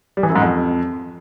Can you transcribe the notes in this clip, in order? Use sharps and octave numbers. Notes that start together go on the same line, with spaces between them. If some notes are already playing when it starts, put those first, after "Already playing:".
G3
E3
F#2
G#2
F2